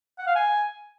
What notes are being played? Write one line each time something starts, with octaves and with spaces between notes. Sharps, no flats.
F#5
F5
G#5